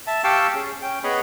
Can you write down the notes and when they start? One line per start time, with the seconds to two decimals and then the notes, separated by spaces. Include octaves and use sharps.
0.07 E5 A5
0.24 G4 F5 G5 A5 C#6 E6
0.55 C#4 G#4
0.82 C#4 G5
1.04 B3 G#4 C#5 D#5 B5